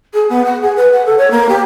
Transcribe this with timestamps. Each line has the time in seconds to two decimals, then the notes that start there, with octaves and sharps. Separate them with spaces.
0.14 G#4
0.30 B3
0.45 F#5
0.62 G#4
0.76 B4
0.93 F#5
1.06 A4
1.18 C#5
1.31 A#3
1.49 G4